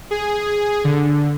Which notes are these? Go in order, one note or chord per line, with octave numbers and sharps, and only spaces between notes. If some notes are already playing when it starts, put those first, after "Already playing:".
G#4
D3